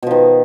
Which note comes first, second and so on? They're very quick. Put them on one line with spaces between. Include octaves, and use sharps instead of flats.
B2 F3 D#3